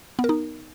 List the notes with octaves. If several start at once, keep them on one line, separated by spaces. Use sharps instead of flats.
B3
A#4
D#4